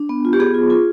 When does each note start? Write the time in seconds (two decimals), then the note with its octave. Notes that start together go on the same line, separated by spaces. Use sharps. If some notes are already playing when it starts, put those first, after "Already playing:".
Already playing: D4
0.09 B3
0.25 F4
0.33 G4
0.39 B3 G#4
0.54 F4
0.70 F4